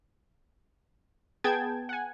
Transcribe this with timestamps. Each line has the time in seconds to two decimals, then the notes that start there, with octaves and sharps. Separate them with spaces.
1.44 B3 G#4 G5 A5 G#6
1.89 F#5 G#5